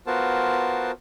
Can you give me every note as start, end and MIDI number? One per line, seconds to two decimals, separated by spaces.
0.07 0.91 59
0.07 0.91 65
0.07 0.91 66
0.07 0.91 70
0.07 0.91 72
0.07 0.91 81